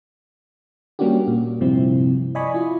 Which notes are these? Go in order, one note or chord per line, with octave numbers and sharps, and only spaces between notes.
G3 A#3 C#4 D4 F#4 G4
A#2
G2 C3 F3 C4 E4
D5 D#5 G#5 B5 C#6
E4 F4